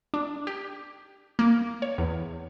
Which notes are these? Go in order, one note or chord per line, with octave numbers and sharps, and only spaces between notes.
D4
G4
A#3
C#5
E2